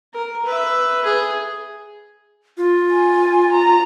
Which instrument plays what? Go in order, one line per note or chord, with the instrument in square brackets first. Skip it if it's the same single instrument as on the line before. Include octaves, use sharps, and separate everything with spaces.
[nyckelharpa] A#4
B4 E5
G#4
[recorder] F4
[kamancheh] G#5
A#5